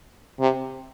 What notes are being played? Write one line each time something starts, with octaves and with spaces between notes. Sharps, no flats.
C3